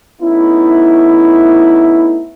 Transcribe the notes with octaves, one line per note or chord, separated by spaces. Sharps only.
A3 B3 C#4 D#4 E4